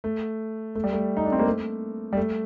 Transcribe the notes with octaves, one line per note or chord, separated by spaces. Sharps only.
A3
A3
G3
A3
D#4
D4
C4
A#3
A3
G3
A3